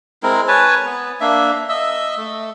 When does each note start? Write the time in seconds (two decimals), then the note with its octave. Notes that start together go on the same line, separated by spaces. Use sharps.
0.23 G#3 C4 E4 A#4
0.48 B4 C#5 G#5 A5
0.85 B3
1.21 A#3 D4 E5
1.69 D#5 E5 E6
2.18 A3